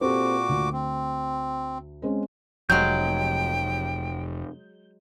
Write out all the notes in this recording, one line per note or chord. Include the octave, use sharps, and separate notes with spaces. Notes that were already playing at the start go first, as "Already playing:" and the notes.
A#2 C4 F#4 G4 A4 D6
D2
C4
G#3 C4 C#4
F1 F#3 G#3 G5 G6